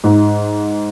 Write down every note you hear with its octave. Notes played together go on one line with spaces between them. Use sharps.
G#2